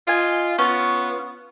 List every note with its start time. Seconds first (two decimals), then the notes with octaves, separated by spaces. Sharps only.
0.07 F4 D#5 G#5
0.58 B3 C#4 F4